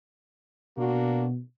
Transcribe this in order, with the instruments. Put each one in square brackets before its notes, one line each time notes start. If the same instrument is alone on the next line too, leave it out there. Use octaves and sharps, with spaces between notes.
[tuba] B2 [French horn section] A#3 D4 F#4